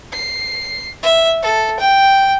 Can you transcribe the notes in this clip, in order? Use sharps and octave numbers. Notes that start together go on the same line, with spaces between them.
C7
E5
A4
G5